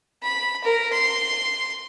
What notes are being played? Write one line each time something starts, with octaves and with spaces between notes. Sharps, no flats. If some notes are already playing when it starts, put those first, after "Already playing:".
B5
A#4
C6